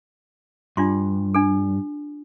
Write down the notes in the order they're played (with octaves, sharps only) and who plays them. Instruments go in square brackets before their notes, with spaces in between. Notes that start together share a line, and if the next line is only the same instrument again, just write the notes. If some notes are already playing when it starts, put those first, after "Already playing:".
[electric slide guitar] G2 [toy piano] D4 F4 C6
[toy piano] D4 A4